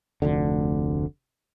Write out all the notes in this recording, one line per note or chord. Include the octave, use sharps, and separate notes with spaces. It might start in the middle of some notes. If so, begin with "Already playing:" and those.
F1 D2 D3